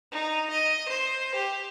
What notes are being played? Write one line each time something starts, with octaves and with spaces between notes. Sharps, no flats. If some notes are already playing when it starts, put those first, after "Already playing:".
D#4
D#5
C5
G4